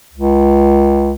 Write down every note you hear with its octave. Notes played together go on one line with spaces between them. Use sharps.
C#2